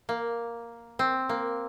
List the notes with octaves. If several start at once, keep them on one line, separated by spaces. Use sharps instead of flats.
A#3
C4
A#3